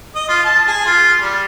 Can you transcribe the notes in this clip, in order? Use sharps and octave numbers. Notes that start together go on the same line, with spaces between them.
D#5
F4
A5
G#4
F4
G3